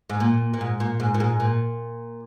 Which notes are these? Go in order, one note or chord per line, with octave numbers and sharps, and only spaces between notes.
G#2
A#2
A#2
G#2
A#2
G#2
A#2
G#2
A#2